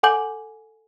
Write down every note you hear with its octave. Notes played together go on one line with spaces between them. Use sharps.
A4 F#5 G#5 D6 G6 F#7